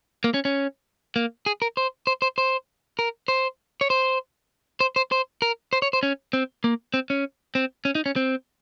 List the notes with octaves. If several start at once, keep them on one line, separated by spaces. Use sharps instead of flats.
A#3
C#4
C#4
A#3
G#4
A#4
C5
C5
C5
C5
A#4
C5
C#5
C5
C5
C5
C5
A#4
C5
C#5
C5
C#4
C4
A#3
C4
C#4
C4
C#4
D#4
C#4
C4